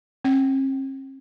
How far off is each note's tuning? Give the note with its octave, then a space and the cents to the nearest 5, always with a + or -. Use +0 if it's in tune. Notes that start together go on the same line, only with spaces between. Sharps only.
C4 +45